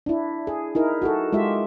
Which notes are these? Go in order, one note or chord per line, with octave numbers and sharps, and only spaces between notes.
D4 E4
G#4
D#4 E4 A#4
F#4 G#4 A4
G#3 F4 G4 E5